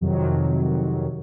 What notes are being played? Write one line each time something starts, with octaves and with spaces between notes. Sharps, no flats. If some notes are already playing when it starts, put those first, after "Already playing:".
F2 C3 D#3 F#3